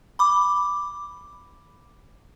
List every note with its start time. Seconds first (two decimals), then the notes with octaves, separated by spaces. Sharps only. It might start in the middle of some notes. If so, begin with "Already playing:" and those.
0.19 B5 D6